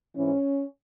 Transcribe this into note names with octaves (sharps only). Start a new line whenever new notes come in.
G#2 E3 C#4